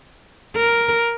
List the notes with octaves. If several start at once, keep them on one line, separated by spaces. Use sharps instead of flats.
A#4